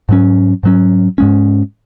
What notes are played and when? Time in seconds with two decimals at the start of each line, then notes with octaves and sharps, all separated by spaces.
0.09 G#2 F#3 C#4
0.63 G#2 F#3 C#4
1.18 G#2 G#3 C#4